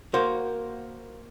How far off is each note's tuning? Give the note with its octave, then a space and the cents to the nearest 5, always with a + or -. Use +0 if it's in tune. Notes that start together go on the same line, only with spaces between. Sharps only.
A#3 +5 F#4 +0 C5 +0